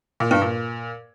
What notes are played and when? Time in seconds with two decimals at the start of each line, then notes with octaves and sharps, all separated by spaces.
0.20 A#2
0.31 G2
0.41 A#2